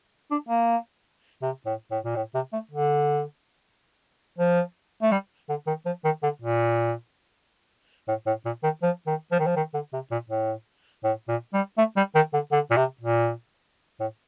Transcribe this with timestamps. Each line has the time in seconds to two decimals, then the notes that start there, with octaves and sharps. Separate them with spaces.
0.31 D4
0.49 A#3
1.42 C3
1.66 A2
1.91 A2
2.05 A#2
2.16 A2
2.35 C3
2.53 A3
2.71 D3
4.39 F3
5.02 A3
5.12 G3
5.49 D3
5.67 D#3
5.86 F3
6.05 D#3
6.23 D3
6.42 A#2
8.08 A2
8.27 A2
8.45 A#2
8.63 D#3
8.83 F3
9.07 D#3
9.32 F3
9.39 D#3
9.47 F3
9.56 D#3
9.74 D3
9.93 C3
10.11 A#2
10.30 A2
11.04 A2
11.28 A#2
11.54 G3
11.78 A3
11.97 G3
12.15 D#3
12.34 D3
12.52 D3
12.71 A#2
12.77 C3
13.01 A#2
14.00 A2